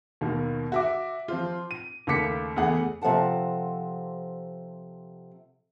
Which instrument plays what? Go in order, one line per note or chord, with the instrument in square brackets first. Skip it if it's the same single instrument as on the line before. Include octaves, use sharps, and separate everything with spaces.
[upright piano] D#2 B2 D#3
F#4 E5 D6
F3 C4 F4
D#7
D#2 C#3 A3 D6 B6 C#7
E2 E3 A3 G#4 F#5
[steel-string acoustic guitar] C3 F3 A4 F#5 A5